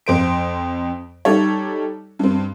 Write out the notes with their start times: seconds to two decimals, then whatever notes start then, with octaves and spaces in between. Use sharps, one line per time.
0.06 F2 C5 D7
1.25 G3 D#4 A4 C#5
2.19 G2 C4